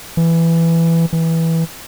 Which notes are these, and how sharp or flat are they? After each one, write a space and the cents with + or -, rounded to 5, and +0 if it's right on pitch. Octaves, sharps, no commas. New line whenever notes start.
E3 +10
E3 -10